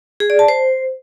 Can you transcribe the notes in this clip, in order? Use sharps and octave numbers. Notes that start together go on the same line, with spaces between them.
G#4
D5
A5
C5